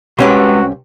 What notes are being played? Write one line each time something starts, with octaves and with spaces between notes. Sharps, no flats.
C2 G#3 C#4 F#4 G4 B4 C6